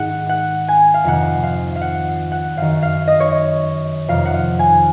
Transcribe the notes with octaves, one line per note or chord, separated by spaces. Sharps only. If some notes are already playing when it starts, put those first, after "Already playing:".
Already playing: G#2 D#3 F#5
F#5
G#5
F5
F2 C3 D#3 F#5
F5
F5
F#5
F#5
F#2 D#3 F5
F5
D#5
C#5
D#5
F2 C3 D#3 F5
F#5
F5
G#5